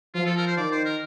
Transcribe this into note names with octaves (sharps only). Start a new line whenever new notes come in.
F3 F4
A4
A#4
C5
D#3 D5
C5
A#4